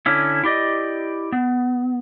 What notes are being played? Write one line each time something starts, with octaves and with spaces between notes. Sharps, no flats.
D3 C#4 E4
E4 G4 D5 D#5
B3